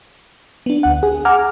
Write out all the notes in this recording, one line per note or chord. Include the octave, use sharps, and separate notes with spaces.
B3 D4
D2 F#5
G#4
F#5 G#5 A#5 D6 F6